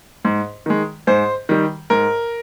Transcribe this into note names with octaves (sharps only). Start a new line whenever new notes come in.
G#2
D#3 G#3
G#2 C5
D#3 G3
G#2 A#4